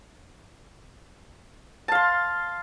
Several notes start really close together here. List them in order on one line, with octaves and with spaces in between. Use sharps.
A5 F5 C6